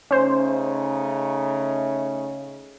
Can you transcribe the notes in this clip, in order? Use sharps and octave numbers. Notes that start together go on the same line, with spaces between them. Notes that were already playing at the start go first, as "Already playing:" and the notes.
C#3 A3 C#4 D#4 C5